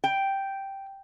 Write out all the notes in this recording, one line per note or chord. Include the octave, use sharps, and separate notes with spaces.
G5